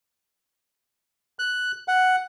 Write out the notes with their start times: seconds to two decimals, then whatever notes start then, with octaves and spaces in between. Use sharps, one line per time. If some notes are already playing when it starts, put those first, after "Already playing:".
1.39 F#6
1.88 F#5